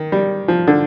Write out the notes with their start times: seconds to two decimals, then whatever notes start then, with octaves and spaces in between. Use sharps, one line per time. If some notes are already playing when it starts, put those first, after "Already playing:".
Already playing: D#3
0.12 G3
0.48 F3
0.68 D3